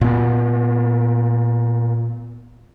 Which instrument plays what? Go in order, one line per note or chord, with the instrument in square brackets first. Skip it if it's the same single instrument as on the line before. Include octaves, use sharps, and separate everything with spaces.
[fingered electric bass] A#2 B3